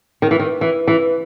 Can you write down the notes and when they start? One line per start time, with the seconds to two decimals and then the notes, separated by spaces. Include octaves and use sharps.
0.22 D#3
0.31 E3
0.39 D#3
0.61 E3
0.88 E3